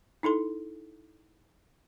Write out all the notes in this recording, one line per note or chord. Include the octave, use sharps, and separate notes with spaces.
D#4 E4 A4 C6